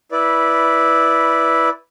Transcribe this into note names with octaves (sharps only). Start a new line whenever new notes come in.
E4 B4 D5